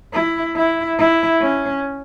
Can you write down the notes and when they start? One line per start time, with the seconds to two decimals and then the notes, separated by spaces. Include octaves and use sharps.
0.13 E4
0.56 E4
0.98 E4
1.41 C#4